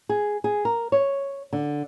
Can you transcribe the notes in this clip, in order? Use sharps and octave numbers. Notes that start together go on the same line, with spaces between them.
G#4
G#4
A#4
C#5
D3